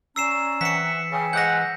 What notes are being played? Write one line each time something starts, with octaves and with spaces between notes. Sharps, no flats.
C#4 D5 A#5 E6 C7 E7
E3 C4 E5 F#5 B6 C#7
C#3 G5 G#5
G#2 F#5 G6 A#6